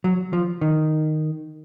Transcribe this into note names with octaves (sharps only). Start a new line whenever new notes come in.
F#3
F3
D#3